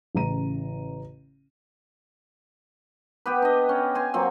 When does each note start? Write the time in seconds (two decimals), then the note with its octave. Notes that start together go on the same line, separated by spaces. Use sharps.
0.15 A1 C#3 A#5 D#7
3.26 B3 G4 B4
3.42 D4 D#5
3.69 C#4
3.95 G#5 C6
4.14 F#3 A#3 C4